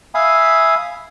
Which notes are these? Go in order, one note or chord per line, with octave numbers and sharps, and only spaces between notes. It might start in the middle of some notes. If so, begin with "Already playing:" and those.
E5 F5 G#5 B5 D#6